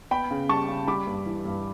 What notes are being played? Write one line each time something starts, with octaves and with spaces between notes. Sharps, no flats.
B3 G5 B5
C#3
G3 A5 C#6
C#3
G3 B5 D6
G2
E3
G2